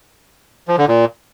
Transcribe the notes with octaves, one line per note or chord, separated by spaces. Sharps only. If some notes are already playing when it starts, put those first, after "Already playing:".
F3
D3
A#2